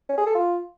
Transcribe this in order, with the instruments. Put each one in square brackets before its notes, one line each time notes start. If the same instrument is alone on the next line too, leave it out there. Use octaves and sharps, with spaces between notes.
[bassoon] C#4
G#4
A4
F4